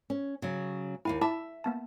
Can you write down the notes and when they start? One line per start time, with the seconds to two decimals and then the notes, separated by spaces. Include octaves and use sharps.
0.10 C#4
0.42 C#3 F#3
1.05 D#2 E4 F5 G#5
1.21 E4 E5 A5 D6
1.64 A#3 B3 A5